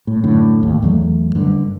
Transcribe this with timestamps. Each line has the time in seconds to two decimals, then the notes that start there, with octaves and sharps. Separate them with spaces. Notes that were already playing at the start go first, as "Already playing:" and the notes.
0.07 A2
0.23 F#2 A2 D3
0.61 A1 D#2 A2
0.82 E2 F#3 A3
1.35 F#1 G2 D3